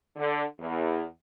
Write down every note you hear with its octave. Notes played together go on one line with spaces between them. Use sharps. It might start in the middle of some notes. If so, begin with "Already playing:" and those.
D3
E2